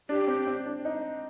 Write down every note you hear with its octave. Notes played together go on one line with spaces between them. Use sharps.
D4 G4
C4
C4
D4
D#4